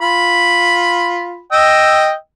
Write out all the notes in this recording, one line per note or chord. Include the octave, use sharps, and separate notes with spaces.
F4 B5
D#5 G5 E6